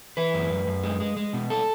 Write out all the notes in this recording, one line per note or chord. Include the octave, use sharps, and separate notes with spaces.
E3 B4
F#2
F#2
F#2
G#3
G#3
G#3
B2
A4